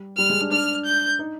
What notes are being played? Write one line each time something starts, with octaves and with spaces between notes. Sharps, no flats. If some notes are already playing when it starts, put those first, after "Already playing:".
Already playing: G3
G3 F6
G#3
D4
D4 F6
G6
D#4